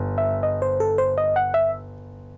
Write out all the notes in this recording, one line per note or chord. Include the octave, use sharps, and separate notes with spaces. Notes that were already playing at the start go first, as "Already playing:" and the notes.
Already playing: G1
E5
D#5
C5
A4
C5
D#5
F#5
E5